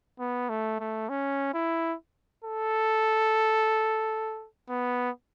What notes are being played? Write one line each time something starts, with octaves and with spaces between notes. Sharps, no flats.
B3
A3
A3
C#4
E4
A4
B3